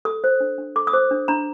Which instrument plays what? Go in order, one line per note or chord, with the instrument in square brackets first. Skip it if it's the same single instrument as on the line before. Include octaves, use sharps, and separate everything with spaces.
[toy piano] A4 D#6
C5
D4
D4
A4 D6
D#6
C5 D6
D4
D4 A#5